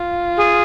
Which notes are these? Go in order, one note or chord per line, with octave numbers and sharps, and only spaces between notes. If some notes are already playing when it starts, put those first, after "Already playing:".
Already playing: F4
G#4